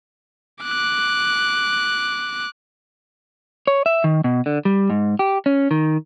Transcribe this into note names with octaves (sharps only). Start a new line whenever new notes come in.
D6 F#6
C#5
E5
D#3
B2
D3
G3
G#2
G4
C#4
D#3